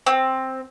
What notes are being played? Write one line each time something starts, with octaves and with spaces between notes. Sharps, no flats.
C4